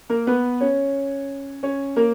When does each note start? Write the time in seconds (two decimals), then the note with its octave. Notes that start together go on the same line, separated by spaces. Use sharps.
0.10 A#3 A#4
0.27 B3 B4
0.61 C#4 C#5
1.63 C#4 C#5
1.96 A#3 A#4